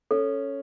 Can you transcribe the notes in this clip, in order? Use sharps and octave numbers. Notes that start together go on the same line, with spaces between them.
C#4 A4